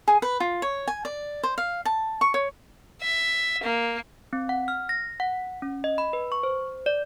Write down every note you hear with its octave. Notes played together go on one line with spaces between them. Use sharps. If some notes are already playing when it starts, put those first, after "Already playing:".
G#4
B4
F4
C#5
G#5
D5
C5
F5
A5
C#6
C#5
E5
A#3
C4
F#5
F6
A#6
F#5
C#4
D#5
B5
B4
C#6
C5
D5